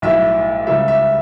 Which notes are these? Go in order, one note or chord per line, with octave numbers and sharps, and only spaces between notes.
B1 A2 G3 E5
C#2 C#3 G3 E5
E5